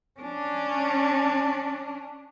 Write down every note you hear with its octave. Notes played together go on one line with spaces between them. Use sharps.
C#4 D4